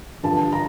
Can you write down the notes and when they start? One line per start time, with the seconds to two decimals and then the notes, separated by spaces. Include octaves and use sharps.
0.23 G2 D3 F3 A5
0.52 A#5